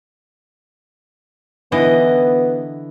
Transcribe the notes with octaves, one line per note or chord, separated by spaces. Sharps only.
D3 E3 B3 D#5